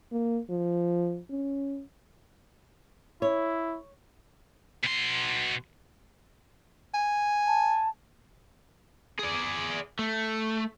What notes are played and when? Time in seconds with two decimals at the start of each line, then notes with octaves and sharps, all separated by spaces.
0.12 A#3
0.50 F3
1.30 C#4
3.22 E4 C#5
4.84 B2 C6
6.94 G#5
7.47 A5
9.19 G#4 D5
9.99 A3